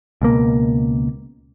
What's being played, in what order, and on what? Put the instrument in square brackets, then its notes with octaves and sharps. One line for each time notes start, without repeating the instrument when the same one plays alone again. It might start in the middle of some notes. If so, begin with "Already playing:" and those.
[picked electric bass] C#2 B2 A#3